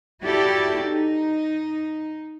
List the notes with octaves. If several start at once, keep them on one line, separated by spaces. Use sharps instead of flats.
E4 F#4 G4 A4 D5
D#4